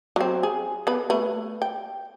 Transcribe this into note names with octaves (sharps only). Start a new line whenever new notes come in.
F#3 C4
G#4
B3 B4
A3 B4
G5